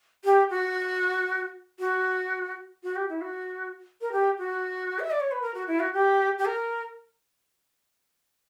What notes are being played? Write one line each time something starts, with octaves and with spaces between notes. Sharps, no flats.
G4
F#4
F#4
F#4
G4
E4
F#4
A#4
G4
F#4
E5
D5
C#5
B4
A#4
F#4
E4
F#4
G4
G4
A#4